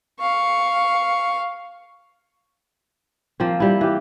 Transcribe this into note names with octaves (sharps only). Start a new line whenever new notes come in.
F5 C#6
F3 A#3 C4
F3 G3 E4
E3 G4